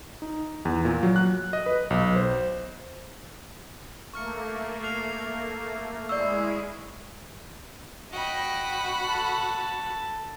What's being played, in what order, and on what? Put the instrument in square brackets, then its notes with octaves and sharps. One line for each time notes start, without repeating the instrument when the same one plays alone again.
[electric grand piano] D#4
E2
A#2
F#3
F#6
D#5
B4
B1
C5
[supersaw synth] A3 A#3 [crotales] C#6 F6 C#7
[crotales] F6 C7 F7
[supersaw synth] G#3 E4 G#4 [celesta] D5 E6 [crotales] C#6 C7
[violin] F#4 B5 [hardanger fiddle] D#5 G5
[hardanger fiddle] A4